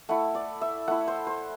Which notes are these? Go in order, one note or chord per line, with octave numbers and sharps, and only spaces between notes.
A3 E4 F#5
D5
E5
A3 E4 F#5
C5
C5